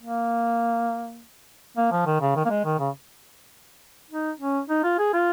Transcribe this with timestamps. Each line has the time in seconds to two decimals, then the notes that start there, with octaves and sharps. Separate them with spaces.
0.02 A#3
1.77 A#3
1.92 F3
2.06 D#3
2.21 C#3
2.36 D#3
2.45 A#3
2.50 G#3
2.65 D#3
2.79 C#3
4.11 D#4
4.40 C#4
4.70 D#4
4.84 F4
4.99 G#4
5.14 F4